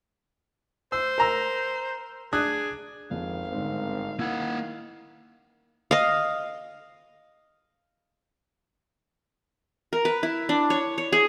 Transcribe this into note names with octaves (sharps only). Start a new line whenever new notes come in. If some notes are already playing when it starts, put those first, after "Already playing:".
C5 E6
A#4 A#5 E6
D4 G#4 D#6 F#6
G#1 F2 F5
G1 G#2 C4
D#3 A#3 E4 F#5 E6 G#6
D#5 F5
A#4
B4
E4
D4
C#5
C#5
G#4